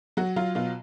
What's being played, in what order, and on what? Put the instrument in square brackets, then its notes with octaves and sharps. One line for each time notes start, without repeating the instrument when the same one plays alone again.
[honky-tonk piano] F#3 F#4
F#3 F4
B2 F4